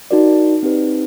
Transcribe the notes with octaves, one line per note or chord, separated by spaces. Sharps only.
D#4 F#4 A#4 D5
C4 D#4 G4 B4